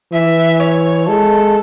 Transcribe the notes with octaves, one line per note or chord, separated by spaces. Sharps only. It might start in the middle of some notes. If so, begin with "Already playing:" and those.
E3 E5
C#5
G#3 A4